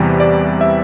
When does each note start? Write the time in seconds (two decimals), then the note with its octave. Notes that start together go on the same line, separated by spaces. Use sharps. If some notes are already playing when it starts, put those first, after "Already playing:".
Already playing: E2 C3 E3 G3
0.20 D5
0.61 E5